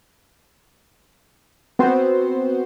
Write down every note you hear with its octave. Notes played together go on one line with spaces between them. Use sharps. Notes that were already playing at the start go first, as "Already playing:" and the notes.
B3 C4 F#4 C5